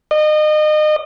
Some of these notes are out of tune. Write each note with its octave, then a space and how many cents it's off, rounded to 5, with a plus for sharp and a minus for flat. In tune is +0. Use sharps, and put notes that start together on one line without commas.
D#5 -30